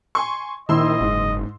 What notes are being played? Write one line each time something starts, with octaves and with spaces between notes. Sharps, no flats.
G#5 C6 C#6
A#1 D#3 E4 D#5 C6 E6
F#1 G#2